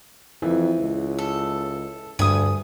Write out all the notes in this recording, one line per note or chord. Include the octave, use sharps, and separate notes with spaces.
F2 E3
C#2
A4
D2 G2 G#5 D#6